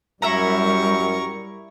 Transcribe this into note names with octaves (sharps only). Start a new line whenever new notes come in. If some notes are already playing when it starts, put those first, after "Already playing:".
F#2 G3 E4 A#4 E5 A#5 C#6